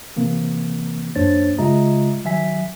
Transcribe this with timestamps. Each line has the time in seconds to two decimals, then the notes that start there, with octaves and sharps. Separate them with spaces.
0.16 C3 E3 A#3 C4
1.16 F#2 A#3 D4 C5 C#5 A6
1.59 C#3 G#3 F4 D#5 E5 A#5
2.25 D#3 F#3 E5 G#5 B6